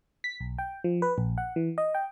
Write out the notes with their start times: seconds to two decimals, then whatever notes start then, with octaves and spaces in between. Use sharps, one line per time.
0.24 B6
0.40 B1
0.58 G5
0.84 F3
1.02 B4
1.18 A#1
1.38 F#5
1.56 E3
1.78 D#5
1.95 G5